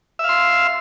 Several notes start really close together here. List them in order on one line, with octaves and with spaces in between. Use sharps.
E5 F5 C6